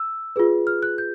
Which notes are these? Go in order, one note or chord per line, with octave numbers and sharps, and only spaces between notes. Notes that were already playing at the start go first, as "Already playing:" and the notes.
Already playing: E6
F4 G#4 B4
F6
F#6
G6